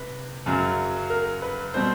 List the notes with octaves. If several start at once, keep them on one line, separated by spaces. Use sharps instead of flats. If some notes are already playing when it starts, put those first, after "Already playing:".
Already playing: C3 B4
F#2 C#3 F#3
A#4
B4
B2 G3 C4 C5